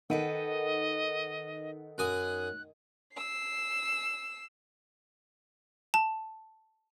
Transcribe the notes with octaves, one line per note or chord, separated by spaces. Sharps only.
D#3 A4 B4 D#5 F#5 G5 D#7
F#2 G#5 D#6 F#6
E6 C7
A5